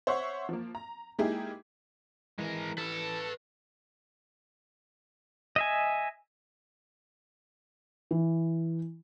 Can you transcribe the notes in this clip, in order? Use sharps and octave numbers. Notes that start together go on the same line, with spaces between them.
C5 C#5 E5 F#5 C#6
F3 A#3
A#5
G#3 A#3 D#4 E4 G4 G#4
E3 G#3 A#4
A4 B4 A5
D#5 E5 G#5
E3